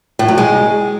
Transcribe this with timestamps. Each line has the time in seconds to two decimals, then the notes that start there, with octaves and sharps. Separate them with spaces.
0.19 A2
0.28 F#3
0.38 G#3